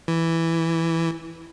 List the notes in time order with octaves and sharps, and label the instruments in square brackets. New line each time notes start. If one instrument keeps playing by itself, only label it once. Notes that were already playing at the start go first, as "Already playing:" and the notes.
[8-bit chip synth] E3